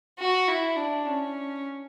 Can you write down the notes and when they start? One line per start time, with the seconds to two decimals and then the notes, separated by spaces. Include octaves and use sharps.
0.19 F#4
0.48 E4
0.76 D4
1.05 C#4